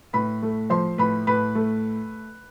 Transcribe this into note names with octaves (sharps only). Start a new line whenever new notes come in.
A2 B4 B5
A3
F3 C5 C6
A2 B4 B5
A2 B4 B5
A3